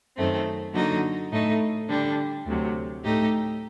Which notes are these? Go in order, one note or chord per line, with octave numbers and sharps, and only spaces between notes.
F#2 D#3 A3 C4
D3 F#3 A#3 D#4 F#4
A2 A3 D#4
D3 G3 D4
D2 C3 F#3
A2 A3 D#4 G4